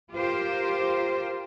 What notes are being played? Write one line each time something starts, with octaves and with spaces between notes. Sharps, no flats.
F4 G4 A#4 C5